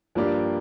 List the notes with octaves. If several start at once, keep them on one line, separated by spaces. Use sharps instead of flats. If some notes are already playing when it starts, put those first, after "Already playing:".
G2 F3 A#3 G4 D5